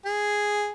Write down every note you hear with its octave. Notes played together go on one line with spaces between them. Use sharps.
G#4